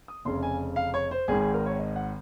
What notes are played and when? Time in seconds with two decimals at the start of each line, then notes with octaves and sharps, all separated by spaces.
0.08 D#6
0.25 F1 F2 C#3 C6
0.43 G#5
0.76 F5
0.94 C#5
1.11 C5
1.28 G#1 G#2 D#3 G#4
1.40 G#4
1.54 A#4
1.66 C#5
1.79 D#5
1.96 F#5